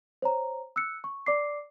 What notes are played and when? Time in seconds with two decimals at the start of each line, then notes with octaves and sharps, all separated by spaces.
0.22 C5 C#5 A#5
0.76 E6 F#6 C#7
1.04 C#6
1.26 D5 D6 C7